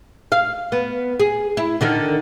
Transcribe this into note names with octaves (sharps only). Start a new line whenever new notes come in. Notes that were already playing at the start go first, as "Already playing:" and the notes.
F5
B3
G#4
E4
D3 D#3 A#4